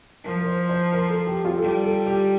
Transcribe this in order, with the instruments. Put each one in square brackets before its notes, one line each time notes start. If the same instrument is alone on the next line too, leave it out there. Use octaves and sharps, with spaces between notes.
[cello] F3 [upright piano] A#4
[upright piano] A#4
C5
C5
A#4
A4
G4
F4
A4
[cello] G3 [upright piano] G4
[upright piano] A4
G4